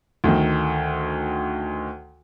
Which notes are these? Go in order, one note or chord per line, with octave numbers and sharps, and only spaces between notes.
D2 D#3